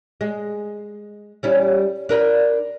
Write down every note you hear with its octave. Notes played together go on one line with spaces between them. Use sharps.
G#3
G3 C#4 E4
D4 A#4 B4